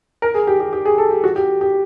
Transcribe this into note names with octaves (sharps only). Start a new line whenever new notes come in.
A#4
G#4
G4
G4
G4
G#4
A4
G4
F#4
G4
G4